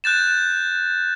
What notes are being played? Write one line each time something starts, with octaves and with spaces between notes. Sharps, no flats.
F#6 G6 A6 E7